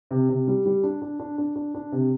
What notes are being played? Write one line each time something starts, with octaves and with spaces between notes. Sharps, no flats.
C3
C3
G3
G3
D4
D4
D4
D4
D4
D4
C3